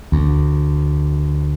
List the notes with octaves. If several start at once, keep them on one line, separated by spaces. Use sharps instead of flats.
D2